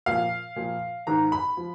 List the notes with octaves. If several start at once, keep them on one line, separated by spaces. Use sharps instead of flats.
A#2 F3 F5
A#2 F3
G#2 D#3 A#5
B5
F3